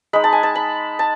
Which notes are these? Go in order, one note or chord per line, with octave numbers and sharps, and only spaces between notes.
G#3 D#4 B5
A5
G#5
A5
B5
A5